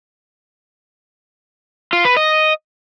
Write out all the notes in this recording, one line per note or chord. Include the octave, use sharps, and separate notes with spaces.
F4
B4
D#5